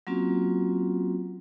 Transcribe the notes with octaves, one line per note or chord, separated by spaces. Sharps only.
F#3 A#3 C4 C#4 F4 F#4